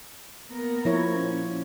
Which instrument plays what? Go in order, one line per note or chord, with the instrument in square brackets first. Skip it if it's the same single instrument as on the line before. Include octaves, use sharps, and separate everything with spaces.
[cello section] A#3 B3 A#4
[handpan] F3 E4 C#5
[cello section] A#2 C#4